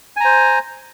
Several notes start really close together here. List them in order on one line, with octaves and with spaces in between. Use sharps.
G#5 A#5 C5